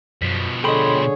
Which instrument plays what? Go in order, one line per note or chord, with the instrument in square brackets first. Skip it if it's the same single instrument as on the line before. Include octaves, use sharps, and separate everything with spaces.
[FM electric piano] F#2 B6 [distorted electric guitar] B2 F3
[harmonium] D3 G#4 C#5 [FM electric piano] A4 D#5 [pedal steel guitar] G5 B5 C6